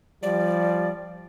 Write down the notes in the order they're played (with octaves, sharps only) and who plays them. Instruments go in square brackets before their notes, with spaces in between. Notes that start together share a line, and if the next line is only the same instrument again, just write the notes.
[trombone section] F3 G3 [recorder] D5